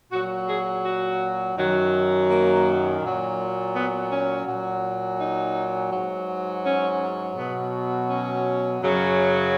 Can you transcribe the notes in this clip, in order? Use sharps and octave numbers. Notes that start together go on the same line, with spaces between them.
A#2 F#3 F#4
G#4
F#4
F#2 D#3 F#3
A#3
A#2 F#3
B3
C#4
A#2 F#3
D#4
G#2 F#3
C#4
B2 F#3 B3
C#4
F#2 C#3 F#3